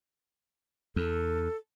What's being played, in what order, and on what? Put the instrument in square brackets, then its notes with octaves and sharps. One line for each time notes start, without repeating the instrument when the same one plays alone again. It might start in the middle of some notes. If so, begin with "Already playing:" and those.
[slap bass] E2 [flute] A4